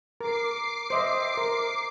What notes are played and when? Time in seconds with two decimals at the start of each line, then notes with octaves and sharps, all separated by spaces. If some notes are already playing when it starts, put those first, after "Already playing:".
0.21 A#4 D6 C7
0.90 C5 D#5 E5
1.37 A#4